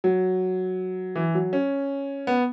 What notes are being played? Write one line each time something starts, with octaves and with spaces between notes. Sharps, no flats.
F#3
E3
F#3
C#4
B3